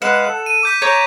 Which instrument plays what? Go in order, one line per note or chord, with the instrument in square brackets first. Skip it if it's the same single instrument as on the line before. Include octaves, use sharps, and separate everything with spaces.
[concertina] G#3 B4 F5 [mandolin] F#5 [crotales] E7
[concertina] A4
[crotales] D#7
D6 G6 B6
[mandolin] C#5 [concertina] A#5 D6 [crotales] G6